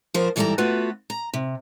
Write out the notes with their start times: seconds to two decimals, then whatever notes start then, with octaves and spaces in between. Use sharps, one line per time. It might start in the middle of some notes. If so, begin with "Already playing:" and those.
0.14 F3 A#4 C5
0.36 G#2 E3 G3 G#4 A4 A#5
0.58 A3 B3 F4 F#4 B4
1.10 A#5
1.34 C3